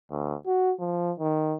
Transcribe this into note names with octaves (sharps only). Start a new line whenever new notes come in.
D2
F#4
F3
D#3